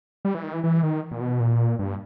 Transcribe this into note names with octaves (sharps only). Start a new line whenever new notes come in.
G3
E3
D#3
E3
E3
D#3
A#2
B2
A#2
G2